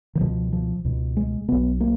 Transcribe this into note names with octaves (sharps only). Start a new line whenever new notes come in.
D#3
C#2 B2 F3
F3
C#2 B2
G#3
B1 B2 B3
A#3